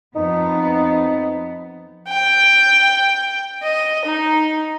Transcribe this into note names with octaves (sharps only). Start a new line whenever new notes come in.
F2 B3 D#4
G5
D#5
D#4